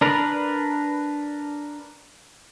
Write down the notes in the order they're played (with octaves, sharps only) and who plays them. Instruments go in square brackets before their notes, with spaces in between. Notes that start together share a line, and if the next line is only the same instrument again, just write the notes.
[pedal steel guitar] D4 A#4 B4